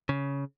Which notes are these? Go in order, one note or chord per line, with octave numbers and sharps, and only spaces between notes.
C#3